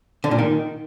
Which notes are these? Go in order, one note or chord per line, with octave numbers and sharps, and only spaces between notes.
D3
A#2
D#3